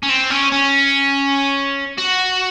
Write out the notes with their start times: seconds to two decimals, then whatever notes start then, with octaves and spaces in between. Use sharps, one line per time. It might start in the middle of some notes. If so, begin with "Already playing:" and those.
0.03 C#4
0.09 C4
0.30 C#4
0.52 C#4
1.98 F#4